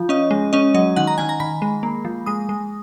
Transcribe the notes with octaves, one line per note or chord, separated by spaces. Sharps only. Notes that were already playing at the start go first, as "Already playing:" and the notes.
Already playing: F3
C#4 D#5
G#3
C#4 D#5
F#3 D#5
D#3 F#5
A#5
D#3 G#5
A#5
D#3 B5
G#3
A#3
F3
G#3 D#6
G#3